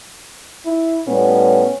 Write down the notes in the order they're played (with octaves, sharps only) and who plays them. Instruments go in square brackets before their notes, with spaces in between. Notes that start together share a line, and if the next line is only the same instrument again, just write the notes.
[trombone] E4
[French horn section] A2 G3 B3 [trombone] C#4